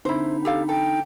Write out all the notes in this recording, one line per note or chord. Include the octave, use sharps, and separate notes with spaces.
D3 C4 D#4 E4 C5 B5
G4 A4 F5
A4 G5